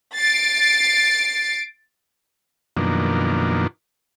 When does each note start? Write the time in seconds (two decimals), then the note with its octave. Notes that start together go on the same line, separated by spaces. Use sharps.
0.16 A6 C7 D7
2.77 F#2 B2 D#3 F3 A#3 D4